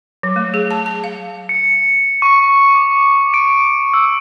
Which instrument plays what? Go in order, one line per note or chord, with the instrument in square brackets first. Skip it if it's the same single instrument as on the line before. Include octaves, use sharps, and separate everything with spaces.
[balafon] F#3
A3
G#4
A5
A5
F5
[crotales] C#7
C#6
D6
D7
E6